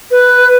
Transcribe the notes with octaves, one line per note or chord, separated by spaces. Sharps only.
B4